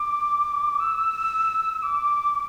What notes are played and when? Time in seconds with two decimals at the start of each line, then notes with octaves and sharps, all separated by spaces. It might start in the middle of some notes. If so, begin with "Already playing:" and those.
Already playing: D6
0.79 E6
1.78 E6
1.83 D6